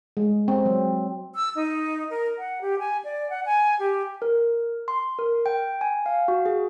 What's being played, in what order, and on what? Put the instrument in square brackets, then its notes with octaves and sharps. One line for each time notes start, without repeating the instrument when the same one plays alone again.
[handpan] G#3
C4
F#3
[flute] E6
D#4
A#4
F#5
G4
G#5
D5
F#5
G#5
G4
[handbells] A#4
C6
A#4
G5
G#5
F5
F#4
G#4